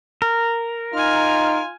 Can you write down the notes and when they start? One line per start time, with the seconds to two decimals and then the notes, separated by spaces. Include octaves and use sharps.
0.22 A#4
0.94 D#4 F4 G#5 F6